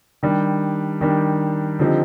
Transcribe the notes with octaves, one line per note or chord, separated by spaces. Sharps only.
D#3 G3 D4 G4
D#3 G3 D4 G4
D3 F3 C4 D#4 G4